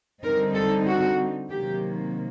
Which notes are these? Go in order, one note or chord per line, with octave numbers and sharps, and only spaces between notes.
D3 G3 C4 D#4 A#4
A4
F#4
C3 D#3 F#3 A#3 G4